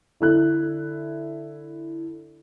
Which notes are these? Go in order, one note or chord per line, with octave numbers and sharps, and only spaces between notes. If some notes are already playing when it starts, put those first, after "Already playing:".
D3 E4 F#6